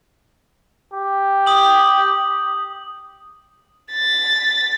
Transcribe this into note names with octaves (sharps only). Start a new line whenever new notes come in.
G4
D#6 F#7
A6 B6